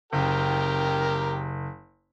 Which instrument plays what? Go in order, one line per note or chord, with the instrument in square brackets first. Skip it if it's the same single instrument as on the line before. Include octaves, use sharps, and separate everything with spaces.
[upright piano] F#1 [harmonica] G4 A#4 G5